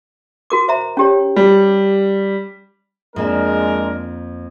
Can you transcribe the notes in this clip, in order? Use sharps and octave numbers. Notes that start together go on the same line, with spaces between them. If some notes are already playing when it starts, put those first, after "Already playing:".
F#4 A#4 D6
C5 E5 A#5
C#4 G4 C#5
G3
F2 G#3 A#3 D4 A#4 E7